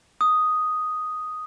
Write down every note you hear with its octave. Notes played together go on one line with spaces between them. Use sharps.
D#6